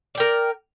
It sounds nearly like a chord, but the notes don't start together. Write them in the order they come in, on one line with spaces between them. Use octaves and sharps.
D5 G5 A#4